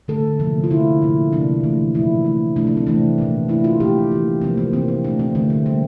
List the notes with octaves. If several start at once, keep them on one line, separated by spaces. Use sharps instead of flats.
D3 A3 A4
C3 F3 A#3
F4
D3 A3 E4
A#2 F3 A#3
C3 F3 A#3 D4
E3 A3
A#2 F3 A#3 E4
E3 A3
C3 F3 A3 D4
D4
C4
C3 E3 A3 D4
A#2 F3 A#3
A#2 A3 E4
F4
A#2 F3 A3 G4
E3 A#3
C3 F3 A#3 C4
A#3
C3 E3 A#3 C4
C4
A#2 A3 D4
C4
D3 A3 C4
C4
A#2 G3 A#3